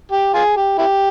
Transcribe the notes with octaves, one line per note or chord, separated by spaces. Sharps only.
G4
F4 G#4
G4
E4 G4